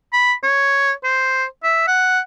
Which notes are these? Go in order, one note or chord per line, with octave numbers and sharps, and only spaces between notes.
B5
C#5
C5
E5
F#5